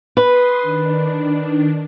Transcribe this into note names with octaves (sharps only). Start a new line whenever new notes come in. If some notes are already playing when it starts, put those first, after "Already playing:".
B4 C6 D#6
D#3 D4